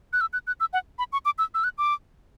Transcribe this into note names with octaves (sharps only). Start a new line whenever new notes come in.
F#6
E6
F#6
F#6
E6
F#5
B5
C#6
D6
E6
E6
F#6
D6